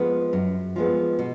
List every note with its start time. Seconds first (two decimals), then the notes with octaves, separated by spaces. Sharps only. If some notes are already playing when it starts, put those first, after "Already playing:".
Already playing: F3 G#3 B3
0.33 F#2
0.76 F3 G#3 B3
1.19 B2